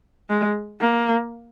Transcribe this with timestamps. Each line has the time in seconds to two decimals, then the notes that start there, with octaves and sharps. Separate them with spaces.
0.29 G#3
0.80 A#3